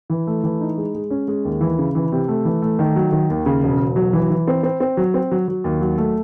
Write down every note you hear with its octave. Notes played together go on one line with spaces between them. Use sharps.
E3
A3
E3
D#4
G#3
G#3
C#4
G#3
D#2
E3
C#3
E3
C3
A3
E3
A3
D#3
F#3
D#3
D#2
C#3
E1
E1
F#3
E3
E3
C4
C4
C4
F#3
C4
F#3
F#3
D#2
F#3
A3